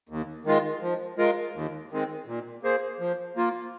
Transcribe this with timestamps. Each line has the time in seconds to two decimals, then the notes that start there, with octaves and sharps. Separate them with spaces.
0.09 D#2
0.45 D#3 G#3 F4
0.81 F3
1.18 G#3 F4 A#4
1.54 D#2
1.91 D#3 G#3 C4
2.27 A#2
2.63 A#3 G#4 C5
3.00 F3
3.36 A#3 F4